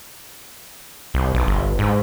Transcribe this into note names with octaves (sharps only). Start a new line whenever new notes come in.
C2
B1
G1
G#2